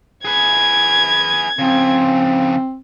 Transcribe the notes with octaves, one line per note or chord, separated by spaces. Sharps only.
G#4 B4 G#6
C#3 F3 C4